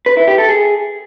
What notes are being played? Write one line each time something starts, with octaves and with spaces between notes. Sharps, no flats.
B4
E4
G4
A4
G#4